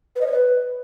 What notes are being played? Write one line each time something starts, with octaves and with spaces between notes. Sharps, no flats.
B4
D#5
C#5
B4